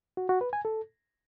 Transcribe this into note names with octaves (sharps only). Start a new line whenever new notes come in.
F#4
F#4
B4
G#5
A4